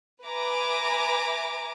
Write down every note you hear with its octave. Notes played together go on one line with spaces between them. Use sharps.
B4 E5 G#5 A#5 D6